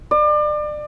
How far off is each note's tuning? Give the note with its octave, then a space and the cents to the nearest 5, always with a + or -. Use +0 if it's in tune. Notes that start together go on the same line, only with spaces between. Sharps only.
D5 +30